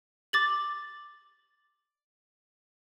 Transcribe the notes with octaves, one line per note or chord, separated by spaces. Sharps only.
D6 A6 F#7